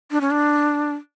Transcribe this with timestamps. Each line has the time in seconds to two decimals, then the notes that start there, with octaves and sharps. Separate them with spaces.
0.11 D4
0.21 C#4
0.31 D4